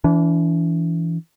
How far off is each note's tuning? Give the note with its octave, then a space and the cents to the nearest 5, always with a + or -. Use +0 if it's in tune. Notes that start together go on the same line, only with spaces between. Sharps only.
E3 +5 D4 -40